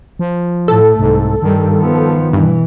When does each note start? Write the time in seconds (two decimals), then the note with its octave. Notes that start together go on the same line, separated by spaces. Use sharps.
0.19 F3
0.68 A2 A3 A4
1.00 C2 G#2
1.42 G2 D#3 G3
1.79 F3 B3
2.33 G2 B2 E3